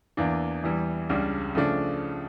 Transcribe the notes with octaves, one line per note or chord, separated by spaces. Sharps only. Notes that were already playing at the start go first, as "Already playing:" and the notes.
E2 E3 A#3 D4
E2 E3 G3
C#2 C#3 G3 D4
C#3 F3 A3 D4